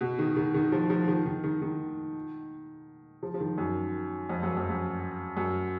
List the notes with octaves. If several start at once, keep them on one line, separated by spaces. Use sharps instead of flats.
B2
D#3
D#3
D#3
F3
F3
D#3
D#3
D#3
D#3
F3
F3
D#3
F#2
F2
F#2
F2
F#2
F#2